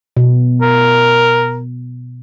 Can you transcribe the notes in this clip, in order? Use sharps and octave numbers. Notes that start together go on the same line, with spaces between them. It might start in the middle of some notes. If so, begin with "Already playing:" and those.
B2
A#4